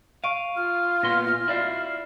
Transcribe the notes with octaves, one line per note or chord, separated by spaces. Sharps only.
F5 C#6 D7 D#7
F4 F6
A#2 B3 C6 A#6
E4 D5 F5